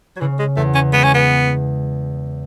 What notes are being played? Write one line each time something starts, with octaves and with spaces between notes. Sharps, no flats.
F#3
C#3 E3
G#3
E2 A3
C#4
G#3 B3
C#4
B3